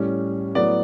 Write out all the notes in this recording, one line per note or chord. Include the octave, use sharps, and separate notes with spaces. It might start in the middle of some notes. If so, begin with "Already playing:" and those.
Already playing: A2 G3 C#4
A2 F#3 B3 D5